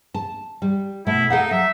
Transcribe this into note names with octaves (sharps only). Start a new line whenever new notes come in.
A5
G3
B2 A3 E4
D#4 A4 F5 F#5
F#3 E5